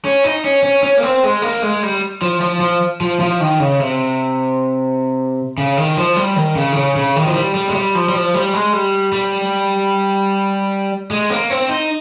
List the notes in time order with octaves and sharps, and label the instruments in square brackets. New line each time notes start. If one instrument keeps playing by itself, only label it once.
[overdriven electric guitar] C#4
D#4
C#4
C#4
C#4
A#3
C4
G#3
A#3
G#3
G3
F3
F3
F3
F3
F3
D#3
C#3
C3
C#3
D#3
F3
G3
D#3
C#3
D#3
C#3
C#3
D#3
F3
G3
G3
G#3
G3
F3
G3
F3
G3
G#3
G3
G3
G#3
A#3
C4
D#4